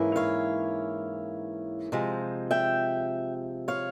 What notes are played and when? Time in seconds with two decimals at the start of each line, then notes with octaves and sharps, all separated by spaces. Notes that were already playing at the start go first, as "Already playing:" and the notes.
Already playing: G#2 E3 A#3 C#4 E4
0.16 C#5 F5
1.92 C3 F3 G#3
2.51 E5 G5
3.68 C#5 F5